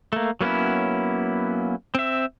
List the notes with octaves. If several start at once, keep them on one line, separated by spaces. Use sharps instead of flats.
A3 A#3
F#3 A#3 B3 C#4 E4
C4 E5